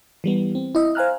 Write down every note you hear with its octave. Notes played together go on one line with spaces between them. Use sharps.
E3 G3 B3
C4
E4 D#5 E5
C5 F5 G#5 A#5 F6 F#6